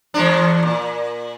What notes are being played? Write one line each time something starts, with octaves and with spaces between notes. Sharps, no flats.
E2 G#3 D4
A#2